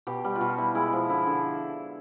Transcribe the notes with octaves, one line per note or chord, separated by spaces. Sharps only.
B2 G4
G3
F4
B2 F#4
G3 E4
G#3 E4
F3
D3 E4
D3